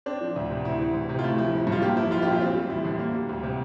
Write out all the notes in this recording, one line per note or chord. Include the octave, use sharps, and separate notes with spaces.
C4 D4
F3
D2
C3
D2 E4
E3
D2
C3
F4
A3 E4
F3 E4
G1
G2
F4
A#3 G4
F3 E4
A#1 F4
A#2 G4
F4
C4
G3
E2 E4
D3
A#3
G3
D2
C3